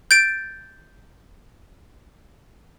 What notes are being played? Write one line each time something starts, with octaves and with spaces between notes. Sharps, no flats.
G6 A6 D7